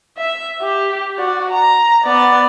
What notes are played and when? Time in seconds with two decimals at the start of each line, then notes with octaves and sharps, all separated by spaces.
0.17 E5
0.61 G4
1.18 F#4 D5
1.51 A#5
2.05 B3 D5